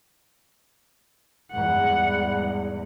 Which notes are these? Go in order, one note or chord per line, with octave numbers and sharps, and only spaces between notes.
E2 G#2 G3 F#5